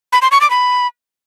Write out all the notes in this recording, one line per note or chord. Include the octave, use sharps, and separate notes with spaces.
B5
C6
C#6
D6
B5